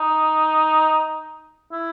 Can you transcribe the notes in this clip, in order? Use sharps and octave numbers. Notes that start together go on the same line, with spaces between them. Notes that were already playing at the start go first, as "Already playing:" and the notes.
Already playing: D#4
E4